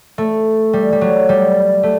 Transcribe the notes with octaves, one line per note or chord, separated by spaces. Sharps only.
A3
G3
G3
F#3
G3
A3